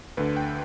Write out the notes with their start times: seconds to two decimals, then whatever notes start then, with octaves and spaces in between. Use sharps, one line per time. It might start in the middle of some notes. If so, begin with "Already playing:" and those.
0.17 D2 D3 B4
0.37 G5